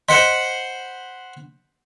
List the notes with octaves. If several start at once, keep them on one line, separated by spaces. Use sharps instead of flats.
C5 D#5 F#5 B5 C6